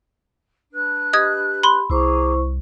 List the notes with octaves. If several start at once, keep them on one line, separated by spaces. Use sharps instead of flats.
D4 B4 F#6
G4 D#5 D#6 G#6
B5 C6
C2 E4 G#4 C5 A#5 C#6 D6